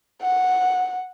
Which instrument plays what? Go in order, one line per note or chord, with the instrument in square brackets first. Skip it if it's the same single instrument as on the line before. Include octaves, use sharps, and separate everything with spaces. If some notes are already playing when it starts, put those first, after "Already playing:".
[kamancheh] F#5